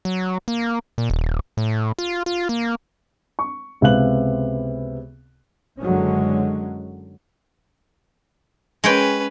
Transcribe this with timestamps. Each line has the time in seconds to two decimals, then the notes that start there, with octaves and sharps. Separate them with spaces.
0.05 F#3
0.48 A#3
0.98 A#2
1.10 D#1
1.57 A2
1.99 F4
2.26 F4
2.49 A#3
3.39 C#6
3.81 C#2 C3 B3 F5 F#6 F#7
5.80 F#1 D3 F#3 G#3 C#4
8.84 G#3 C#4 B4 C#5 G5